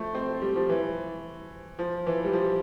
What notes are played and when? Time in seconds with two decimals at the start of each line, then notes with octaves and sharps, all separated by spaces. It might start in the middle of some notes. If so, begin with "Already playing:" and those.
Already playing: F3 A3
0.15 C4
0.42 G3
0.56 F3
0.69 E3
1.79 F3
2.07 E3
2.25 G3
2.33 F3